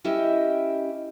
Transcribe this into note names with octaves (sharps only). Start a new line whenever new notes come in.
C#4 E4 G4 D#5 E5